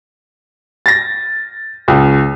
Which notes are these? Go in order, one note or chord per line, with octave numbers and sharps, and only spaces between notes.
A6 A#6
C#2